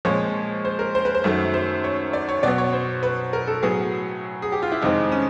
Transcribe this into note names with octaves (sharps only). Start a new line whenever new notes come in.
A#2 F3 G#3 C4 C#5
C5
A#4
C5
B4
C5
F#2 D#3 F#3 A3
C5
C#5
D5
C#5
B2 F#3 B3 D5
C#5
C5
B4
A#4
A4
A2 F#3 B3 G#4
G#4
G4
F4
E4
F2 C3 D#3 G#3 C4 D#4
C#4